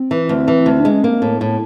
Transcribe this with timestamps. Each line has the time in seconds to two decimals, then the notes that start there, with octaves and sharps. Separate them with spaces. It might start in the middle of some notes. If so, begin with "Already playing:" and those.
Already playing: C4
0.11 E3
0.29 D2
0.48 E3
0.66 D2
0.80 D4
0.85 G#3
0.92 C#4
1.03 A#3 C4
1.22 A2
1.28 B3
1.41 A2